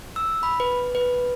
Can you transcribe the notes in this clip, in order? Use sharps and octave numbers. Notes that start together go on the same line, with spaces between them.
E6
B5
B4
B4